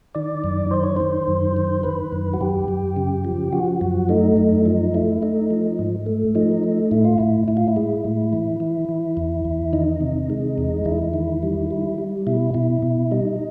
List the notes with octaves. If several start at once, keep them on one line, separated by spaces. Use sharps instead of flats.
D#3 D5
F#2
D#3 C5
C#5
D#3 C5
F#2
D#3
D#3 B4
F#2
F#4
F#2 G4
F#2
C#3
F3
F3 F#4
F#2
A3 D#4
F#2
F3 D#4
A3 E4
A3 D#4
F3
G#2
A3
F3 D#4
A3
A2 E4
F4
A2 E4
A2 E4
F4
E4
G#3
A2
E3
E3
E3
E2
E2
D#3 D#4
C3
G#3
E2
E2 E4
D#3
G3
G3
G3
B2 E4
B2 E4
B2
G3 D#4